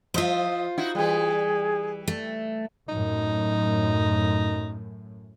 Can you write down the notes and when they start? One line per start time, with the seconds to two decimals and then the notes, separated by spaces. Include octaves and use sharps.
0.14 F3 F4 C5 D#5 E5
0.78 D#4 E4 F#4
0.95 E3 G3 G#4
2.08 A3
2.89 F#2 A2 D#4